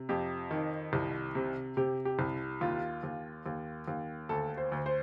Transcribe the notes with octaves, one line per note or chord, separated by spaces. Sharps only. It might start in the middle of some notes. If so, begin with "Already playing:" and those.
Already playing: C3
F2 G4
D#3
C2
C3
C3 G4
G4
C2
D#2 F4
D#2
D#2
D#2
D2 A4
C5
D2
C5